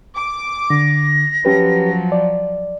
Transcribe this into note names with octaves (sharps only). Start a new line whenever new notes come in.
D6
D3 A#6
F3 F#3 C#4 G4 B4
D5